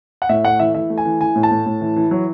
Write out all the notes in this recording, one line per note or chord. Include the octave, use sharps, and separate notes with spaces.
F#5
A2 E5
A3 F#5
E3 E5
E3 E5
A3
G#5
E3
E3 G#5
A2
A5
A2
A2
E3
E3
F#3